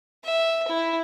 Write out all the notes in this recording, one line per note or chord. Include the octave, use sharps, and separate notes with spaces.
E5
E4